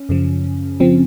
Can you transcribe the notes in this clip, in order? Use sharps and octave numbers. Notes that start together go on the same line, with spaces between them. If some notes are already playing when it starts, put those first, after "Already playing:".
Already playing: C#4
F#2 C#3 F3
C#3 F3 C4